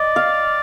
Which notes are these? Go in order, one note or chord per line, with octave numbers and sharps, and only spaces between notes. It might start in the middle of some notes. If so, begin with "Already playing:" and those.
Already playing: D5 D#5
F5